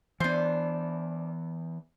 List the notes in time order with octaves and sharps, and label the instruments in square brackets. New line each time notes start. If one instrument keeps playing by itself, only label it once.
[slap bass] E3 B3 [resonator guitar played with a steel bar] D4 C5